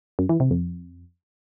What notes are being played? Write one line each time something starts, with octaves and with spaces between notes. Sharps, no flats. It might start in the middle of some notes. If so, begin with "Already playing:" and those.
F#2
E3
C3
F2